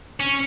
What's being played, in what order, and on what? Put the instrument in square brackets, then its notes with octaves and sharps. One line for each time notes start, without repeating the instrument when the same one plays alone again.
[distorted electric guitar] C#4